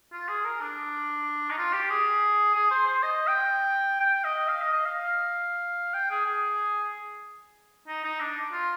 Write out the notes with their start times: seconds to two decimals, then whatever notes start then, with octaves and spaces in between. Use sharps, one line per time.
0.13 F4
0.29 G#4
0.45 A#4
0.61 D4
1.51 D#4
1.58 F4
1.74 G4
1.90 G#4
2.55 G#4
2.71 C5
2.87 C5
3.03 D#5
3.28 G5
4.00 G5
4.24 D#5
4.48 F5
4.61 D#5
4.73 D#5
4.85 F5
5.94 G5
6.10 G#4
6.26 G#4
7.88 D#4
8.04 D#4
8.20 D4
8.53 F4